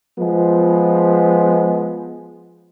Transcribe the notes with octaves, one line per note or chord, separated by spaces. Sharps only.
F3 G#3 B3